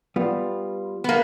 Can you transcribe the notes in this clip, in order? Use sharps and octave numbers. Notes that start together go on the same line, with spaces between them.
G3 B3 F4
A#3 B3